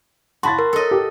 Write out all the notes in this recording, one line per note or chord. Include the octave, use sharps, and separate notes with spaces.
F#4 A5 B5 C6 A6
A#4
A4 D#5
G4